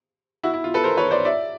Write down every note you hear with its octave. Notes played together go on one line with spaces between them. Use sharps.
E4 F#4
E4
F4
A4 B4
A#4 C5
B4 C#5
C5 D5
D5 E5